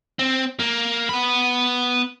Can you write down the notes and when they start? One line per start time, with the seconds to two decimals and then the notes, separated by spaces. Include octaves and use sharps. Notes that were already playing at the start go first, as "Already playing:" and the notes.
0.19 C4
0.59 A#3
1.09 B3 B5